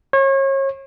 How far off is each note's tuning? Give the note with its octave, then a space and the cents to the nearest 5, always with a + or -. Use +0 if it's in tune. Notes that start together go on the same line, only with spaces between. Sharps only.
C#5 -35